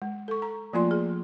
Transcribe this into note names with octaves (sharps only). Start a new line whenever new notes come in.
G#3
A4 C#6
A#5
F3 A3 A#3 F4 D5 C6
G#4